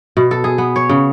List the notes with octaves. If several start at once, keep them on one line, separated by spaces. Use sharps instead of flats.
B2
A4
G#4
B3
C#5
C#3